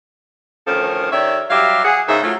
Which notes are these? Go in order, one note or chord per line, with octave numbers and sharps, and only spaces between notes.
D2 D#3 F3 C#4 A4 A#4
D#3 G4 C#5 D5 E5
F#3 G3 G4 E5 F5
G#4 F#5
G#2 C#3 D#4 E5
F#3 A3 F4